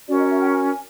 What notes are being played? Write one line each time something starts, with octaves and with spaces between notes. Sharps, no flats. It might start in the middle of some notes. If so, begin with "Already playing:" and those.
C#4 F#4 A#4 D5
D#5
E5
G5
G#5